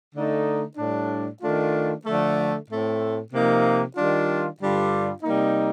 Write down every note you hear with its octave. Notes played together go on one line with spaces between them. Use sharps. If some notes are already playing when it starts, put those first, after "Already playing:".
D3 A3 D#4
A2 G3 D4
D#3 A3 D4 F4
D3 F3 A3
A2 A3 C4
C3 F3 A#3 D#4
D#3 G3 D4 F4
G2 D3 G3 D4 F4
C3 G3 A#3 D#4